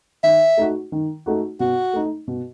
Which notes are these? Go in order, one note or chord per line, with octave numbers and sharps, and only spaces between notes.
D#3 E5
A3 D#4 F#4
D#3
A3 D#4 F#4
B2 F#4
A3 D#4
B2